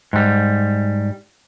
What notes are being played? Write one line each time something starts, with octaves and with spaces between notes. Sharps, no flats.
G#2 G3